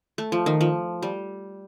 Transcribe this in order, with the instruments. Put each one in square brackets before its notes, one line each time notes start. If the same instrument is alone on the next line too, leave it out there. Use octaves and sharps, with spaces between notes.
[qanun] A3
F3
D#3
F3
G3